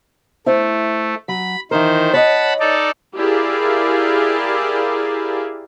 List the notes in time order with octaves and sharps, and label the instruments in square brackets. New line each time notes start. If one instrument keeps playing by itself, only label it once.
[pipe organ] A3 [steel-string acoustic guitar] E4 C5 E5
[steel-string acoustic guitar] F#3 [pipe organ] B5
[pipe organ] D#3 C5 [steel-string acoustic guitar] E3 D#4 A#4
[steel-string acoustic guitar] C#5 D#5 [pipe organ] F#5 A5 B5
[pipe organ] D#4 A4 D5
[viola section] E4 G4 G#4 A#4 D5 F5